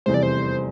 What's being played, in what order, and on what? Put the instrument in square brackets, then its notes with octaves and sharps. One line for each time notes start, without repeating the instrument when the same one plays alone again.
[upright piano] F1 E2 C3 G3 [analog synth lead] C5
[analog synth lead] D5
C5